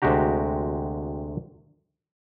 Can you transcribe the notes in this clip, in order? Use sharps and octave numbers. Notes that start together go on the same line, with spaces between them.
D2 C3 G#3 F#4 G4 A#5